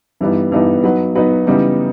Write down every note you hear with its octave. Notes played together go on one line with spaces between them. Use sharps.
G2 E3 G3 B3 D#4
G2 E3 G3 B3 D#4
F#3 B3 D#4 F#4 B4
F#3 B3 D#4 F#4 B4
C#3 E3 G3 B3 D#4